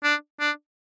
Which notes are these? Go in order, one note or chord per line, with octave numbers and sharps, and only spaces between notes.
D4
D4